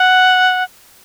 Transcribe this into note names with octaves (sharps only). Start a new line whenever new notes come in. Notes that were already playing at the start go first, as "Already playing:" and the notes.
Already playing: F#5